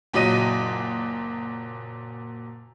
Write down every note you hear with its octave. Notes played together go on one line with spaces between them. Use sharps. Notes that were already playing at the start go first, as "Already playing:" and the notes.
F#1 A#2 F#3 D#5 D#7